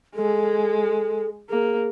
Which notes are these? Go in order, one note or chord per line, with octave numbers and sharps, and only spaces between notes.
G#3 A4
A#3 G#4